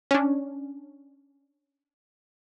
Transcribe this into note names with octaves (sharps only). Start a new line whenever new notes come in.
C#4 D4